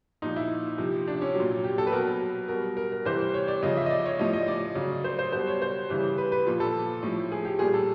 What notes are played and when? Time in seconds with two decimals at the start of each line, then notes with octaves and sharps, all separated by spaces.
0.22 A#2 F3 D#4
0.36 E4
0.78 C3 F3
1.08 D4
1.21 C#4
1.35 A#2 F#3
1.64 G4
1.78 A4
1.87 B4
1.92 B2 F#3 A#4
2.48 B2 G3 A#4
2.77 A#4
2.92 A#4
3.05 C3 E3 G3 C5
3.34 C#5
3.48 D5
3.62 C#3 F3 D#5
3.77 E5
3.86 D#5
3.90 D5
4.06 C#5
4.19 A2 F3 D#5
4.33 D#5
4.48 D5
4.75 C#3 F#3
5.04 C5
5.19 C5
5.32 B2 G3 C5
5.47 C#5
5.62 C5
5.89 C#3 E3 G3
6.18 B4
6.32 B4
6.47 A#2 F3
6.60 A4
7.03 A2 F3
7.32 G#4
7.45 G4
7.59 A#2 G3 G#4
7.74 A4